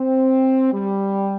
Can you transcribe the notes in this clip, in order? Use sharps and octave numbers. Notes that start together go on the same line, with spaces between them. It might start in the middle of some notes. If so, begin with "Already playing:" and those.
Already playing: C4
G3